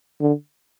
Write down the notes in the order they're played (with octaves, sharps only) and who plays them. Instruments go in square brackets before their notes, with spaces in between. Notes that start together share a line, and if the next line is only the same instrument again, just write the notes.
[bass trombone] D3